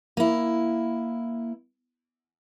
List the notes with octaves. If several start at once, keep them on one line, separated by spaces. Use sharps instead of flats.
A#3 E4